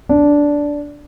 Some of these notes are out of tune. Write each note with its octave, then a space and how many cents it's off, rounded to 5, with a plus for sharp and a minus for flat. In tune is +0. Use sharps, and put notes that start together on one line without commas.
D4 -10